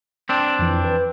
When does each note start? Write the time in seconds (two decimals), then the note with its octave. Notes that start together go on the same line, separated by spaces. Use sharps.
0.29 C4 D4
0.59 F2 E3
0.85 B4